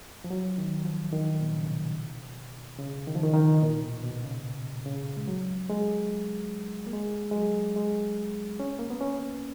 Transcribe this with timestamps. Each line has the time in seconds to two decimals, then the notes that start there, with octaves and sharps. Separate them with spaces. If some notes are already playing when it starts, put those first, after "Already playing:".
0.24 F3
0.30 F#3
0.58 D#3
0.85 F3
1.13 D#3
1.41 A#2
1.56 C#3
1.68 B2
2.78 C#3
3.07 D#3
3.15 F3
3.23 D#3
3.34 D#3
3.62 A#2
3.83 B2
4.03 B2
4.23 C#3
4.85 C#3
5.17 G#3
5.28 F#3
5.70 G#3
6.87 A#3
6.93 G#3
7.31 G#3
7.35 F#3
7.76 G#3
8.60 C#4
8.79 A#3
8.90 B3
9.01 C#4